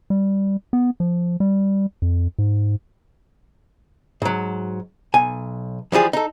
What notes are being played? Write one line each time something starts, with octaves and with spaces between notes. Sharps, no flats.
G3
B3
F3
G3
F2
G#2
G#2 F#3
B1 G#5
E3 F3 G3 G#4
D#4 A4